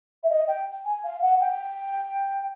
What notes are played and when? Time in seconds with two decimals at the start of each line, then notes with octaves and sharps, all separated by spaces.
0.23 E5
0.29 D#5
0.47 G5
0.85 G#5
1.04 F5
1.21 F#5
1.40 G5